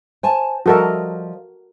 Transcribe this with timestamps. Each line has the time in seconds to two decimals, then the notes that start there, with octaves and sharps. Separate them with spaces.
0.23 C5 G#5 A5
0.66 F3 G3 F#4 A4 A#4 D#5